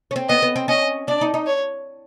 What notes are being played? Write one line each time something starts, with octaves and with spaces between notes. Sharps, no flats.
C#4
C4
B3 D#5
B3
C4
C#4 D#5
D4 D5
D#4
D#4
C#5